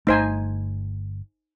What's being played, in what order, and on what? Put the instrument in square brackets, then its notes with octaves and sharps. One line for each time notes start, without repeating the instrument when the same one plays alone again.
[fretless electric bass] G1 A3 [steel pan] D#4 C5 G#5